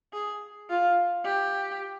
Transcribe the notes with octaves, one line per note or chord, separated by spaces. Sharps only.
G#4
F4
G4